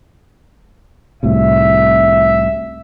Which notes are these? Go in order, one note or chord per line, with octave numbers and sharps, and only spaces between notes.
C2 A2 C3 E5